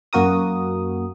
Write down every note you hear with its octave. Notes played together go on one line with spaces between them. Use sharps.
F#2 A#3 F#4 A#4 D#6